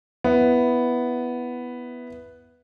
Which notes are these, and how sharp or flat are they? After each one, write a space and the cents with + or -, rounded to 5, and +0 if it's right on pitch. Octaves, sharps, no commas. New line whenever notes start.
B3 +0 E4 +0